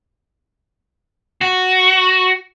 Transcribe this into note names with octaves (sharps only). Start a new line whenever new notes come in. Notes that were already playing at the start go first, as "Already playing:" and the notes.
F#4